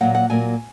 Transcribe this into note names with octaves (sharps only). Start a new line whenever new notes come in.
A#2 F#3 A#3 F#5
F#5
A#2 F#3 A#3 G#5